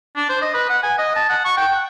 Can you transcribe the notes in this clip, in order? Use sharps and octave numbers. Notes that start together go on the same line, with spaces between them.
D4
C5
D#5
B4
F#5
G#5
D#5
A5
F#5
C#6
G5
F#5